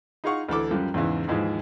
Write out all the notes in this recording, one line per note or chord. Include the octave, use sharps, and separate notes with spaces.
D#4 F4 G#4 F5 F#5 C#6
D2 E3 A4 D6
F#2 F3 G3
E2 G#2 C#3 E3
D#2 G#2 E3 F3 G#3